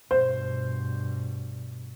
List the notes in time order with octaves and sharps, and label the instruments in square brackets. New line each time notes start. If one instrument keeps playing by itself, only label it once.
[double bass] G2 B2 [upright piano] C5